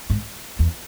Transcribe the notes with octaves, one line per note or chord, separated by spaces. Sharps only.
G#2
E2